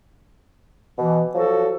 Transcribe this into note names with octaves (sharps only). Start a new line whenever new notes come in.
B2 E3
F3 F#3 F#4 A4